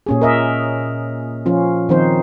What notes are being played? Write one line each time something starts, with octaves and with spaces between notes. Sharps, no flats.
A#2 C#4 G#4
A#4 D#5 E5
F3 C#4 F4
D#3 F3 C4 D#4 C5